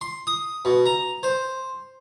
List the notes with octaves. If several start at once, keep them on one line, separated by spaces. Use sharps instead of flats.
C6
D#6
B2
A#5
C5